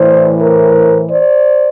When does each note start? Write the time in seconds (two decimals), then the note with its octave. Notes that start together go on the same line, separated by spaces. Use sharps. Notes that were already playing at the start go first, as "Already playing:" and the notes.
Already playing: A2 E3 C5 D5
0.41 A#4 C5
1.11 C5 D5